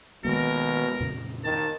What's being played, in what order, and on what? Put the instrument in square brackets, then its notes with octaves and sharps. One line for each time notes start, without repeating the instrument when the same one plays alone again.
[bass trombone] B2 [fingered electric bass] D#3 G#3 A#3 [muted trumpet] A#4
[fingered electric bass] F2 A#2 C#3
[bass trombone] D#3 [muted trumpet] A5